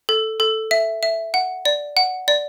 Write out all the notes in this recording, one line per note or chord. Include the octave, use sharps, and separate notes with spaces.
A4
A4
E5
E5
F#5
D5
F#5
D5